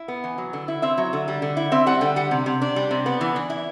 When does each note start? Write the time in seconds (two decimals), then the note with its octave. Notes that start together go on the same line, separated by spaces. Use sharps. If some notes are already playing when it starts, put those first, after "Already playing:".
Already playing: E4
0.08 B3
0.24 E3
0.38 F#3
0.53 D3
0.68 E4
0.82 C4 E5
0.98 F#3
1.13 D3
1.28 G3
1.42 D3
1.57 E4
1.72 C4 E5
1.87 G3 F#5
2.01 D3 G5
2.16 G3 F#5
2.31 C3
2.46 C3
2.62 D4
2.76 G3
2.91 C3
3.06 B3 D5
3.21 E3
3.36 E3
3.50 E4